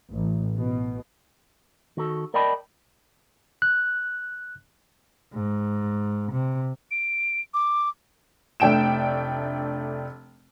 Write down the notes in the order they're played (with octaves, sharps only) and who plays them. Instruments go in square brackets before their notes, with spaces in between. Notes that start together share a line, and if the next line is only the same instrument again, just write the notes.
[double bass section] A1
B2
[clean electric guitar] D#3 F#4 A4
A#4 D5 D#5 G5 A5 B5
[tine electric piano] F#6
[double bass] G#2
C3
[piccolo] D7
D6
[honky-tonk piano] F1 A3 D4 G5 D7 E7